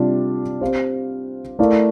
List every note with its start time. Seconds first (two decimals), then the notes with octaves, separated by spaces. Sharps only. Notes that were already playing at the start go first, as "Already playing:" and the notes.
Already playing: C3 G3 D4 F4
0.61 C4 G4 C5 F5
1.59 A3 E4 A#4 D5 F5